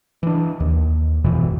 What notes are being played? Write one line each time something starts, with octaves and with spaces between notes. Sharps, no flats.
E3 D4
D#2
G#1 F2 B2 E3